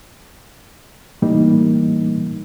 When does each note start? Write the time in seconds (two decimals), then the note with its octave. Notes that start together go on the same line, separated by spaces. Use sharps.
1.22 A2 E3 G3 A#3 D#4